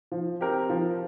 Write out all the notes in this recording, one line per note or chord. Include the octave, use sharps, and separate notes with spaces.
F3
C4 G4 A#4
F3